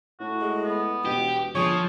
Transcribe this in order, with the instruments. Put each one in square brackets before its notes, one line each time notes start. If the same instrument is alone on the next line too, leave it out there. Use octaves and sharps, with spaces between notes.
[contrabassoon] A2 [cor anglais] F#4
[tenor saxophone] G#3
[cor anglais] B3
[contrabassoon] E1 [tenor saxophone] B2 [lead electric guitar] G4
[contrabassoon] G1 [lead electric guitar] F3 [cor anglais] G#4 [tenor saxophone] C#5